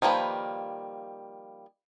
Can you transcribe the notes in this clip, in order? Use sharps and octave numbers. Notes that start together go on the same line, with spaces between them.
D#3 F3 G3 A#3 B4